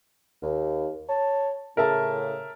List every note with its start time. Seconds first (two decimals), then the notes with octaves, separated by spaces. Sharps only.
0.43 D#2
1.09 C#5 A5
1.77 A2 C#3 A#4 E5 A5